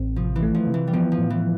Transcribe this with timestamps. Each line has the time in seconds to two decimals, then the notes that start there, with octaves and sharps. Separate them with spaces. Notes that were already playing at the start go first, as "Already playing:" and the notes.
Already playing: A1 C4
0.16 C3 F3
0.36 E3
0.42 A3
0.55 F3
0.67 C3
0.74 E3
0.87 G3
0.93 F3 B3
1.12 F3
1.18 A2
1.30 E3